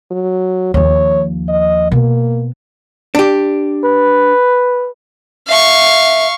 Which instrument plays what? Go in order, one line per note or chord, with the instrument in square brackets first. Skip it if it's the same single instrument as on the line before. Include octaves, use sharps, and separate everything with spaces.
[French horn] F#3
[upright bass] D#2 F3 [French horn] C#5
[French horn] D#5
[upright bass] B2 [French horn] A#3
[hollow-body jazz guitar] D4 G4
[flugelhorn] B4
[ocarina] E5 [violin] F5 C#6